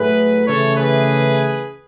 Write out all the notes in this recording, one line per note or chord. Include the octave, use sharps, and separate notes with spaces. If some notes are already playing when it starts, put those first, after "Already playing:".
Already playing: A2 F#3 A3 G#4 B4
C#3 E3 A3 A4 C#5
G#4 B4